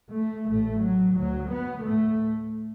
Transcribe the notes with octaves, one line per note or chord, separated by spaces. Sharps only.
A3
A1 A2 A3
F#3
D2 F#3
B3
A2 A3